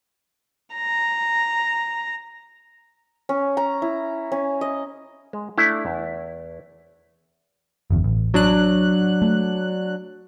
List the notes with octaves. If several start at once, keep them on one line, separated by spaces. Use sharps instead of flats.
A#5
C#4
A#5
E4
C#4
D#5
G#3
A3 D4 E4
E2
G1 E2
A1
F#3 D4 F#6
A3